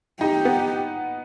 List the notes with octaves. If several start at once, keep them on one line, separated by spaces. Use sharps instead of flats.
D#4 G4
B3